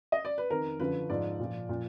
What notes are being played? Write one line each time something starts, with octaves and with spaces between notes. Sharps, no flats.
D#5
D5
B4
F2 D#3 A#4
F#2 D3 F3 B4
G#2 F3 D5
A#2 F3
A#2 F3